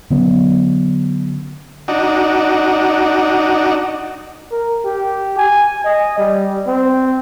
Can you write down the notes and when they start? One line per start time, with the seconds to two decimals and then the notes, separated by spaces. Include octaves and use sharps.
0.10 D3 F#3 B3 C#4
1.88 D4 D#4 F#4
4.51 A#4
4.85 G4
5.38 G#5
5.84 D#5
6.18 G3
6.67 C4